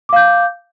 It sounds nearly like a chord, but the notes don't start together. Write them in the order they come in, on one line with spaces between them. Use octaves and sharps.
D6 F5 G6